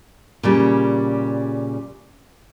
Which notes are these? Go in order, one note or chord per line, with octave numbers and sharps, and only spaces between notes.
A#2 C#3 G3